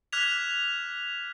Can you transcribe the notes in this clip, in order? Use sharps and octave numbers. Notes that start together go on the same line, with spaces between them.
D6 F6 F#6 G#6 B6 F7